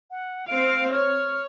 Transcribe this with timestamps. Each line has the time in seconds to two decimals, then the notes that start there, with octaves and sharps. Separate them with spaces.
0.11 F#5
0.48 C4 F5 D7
0.93 C#5 F6